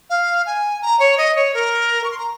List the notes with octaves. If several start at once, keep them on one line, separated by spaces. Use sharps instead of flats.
F5
G#5
A#5
C#5
D#5
C#5
A#4
C#6
C6
A#5